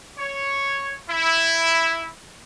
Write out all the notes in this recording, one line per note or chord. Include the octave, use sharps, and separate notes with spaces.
C#5
E4